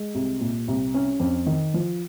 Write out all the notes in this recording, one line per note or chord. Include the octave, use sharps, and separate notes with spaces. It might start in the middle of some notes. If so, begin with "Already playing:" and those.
Already playing: G#3
C2
A#2
C2
C#4
F2
D#3
F3